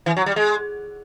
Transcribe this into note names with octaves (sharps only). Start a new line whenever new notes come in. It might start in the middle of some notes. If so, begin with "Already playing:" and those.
E3
F#3
G3
G#3